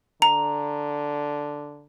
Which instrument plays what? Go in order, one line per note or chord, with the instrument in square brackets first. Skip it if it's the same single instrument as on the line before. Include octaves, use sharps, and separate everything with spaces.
[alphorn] D3 [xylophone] A#5